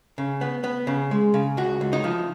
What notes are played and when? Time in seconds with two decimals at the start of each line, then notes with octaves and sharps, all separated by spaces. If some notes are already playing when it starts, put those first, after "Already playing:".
0.18 C#3
0.41 B3
0.64 B3
0.87 C#3
1.11 G#3
1.34 C#3
1.57 C#2 F#4
1.81 C#2
1.93 D#4
2.04 F3